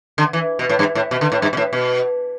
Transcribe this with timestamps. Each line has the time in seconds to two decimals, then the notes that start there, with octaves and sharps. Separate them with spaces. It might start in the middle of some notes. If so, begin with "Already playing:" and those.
0.18 D3
0.33 E3
0.59 B2
0.69 A2
0.79 G2
0.95 A2
1.11 B2
1.21 D3
1.32 A2
1.42 G2
1.53 B2
1.57 A2
1.73 B2